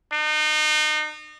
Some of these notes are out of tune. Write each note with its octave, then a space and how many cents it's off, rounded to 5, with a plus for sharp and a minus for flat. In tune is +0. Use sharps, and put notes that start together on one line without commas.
D#4 -35